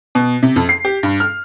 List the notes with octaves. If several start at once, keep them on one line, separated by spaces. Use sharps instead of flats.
B2
C3
F2
C7
G4
G2
F6